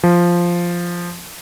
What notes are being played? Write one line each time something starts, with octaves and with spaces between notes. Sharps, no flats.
F3